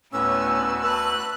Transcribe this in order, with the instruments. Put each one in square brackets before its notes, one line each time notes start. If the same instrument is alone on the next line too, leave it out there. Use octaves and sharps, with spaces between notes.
[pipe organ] D2 F#4 [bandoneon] A2 C#4 [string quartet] B3 [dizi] E6
[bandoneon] B4 [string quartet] A5 F#6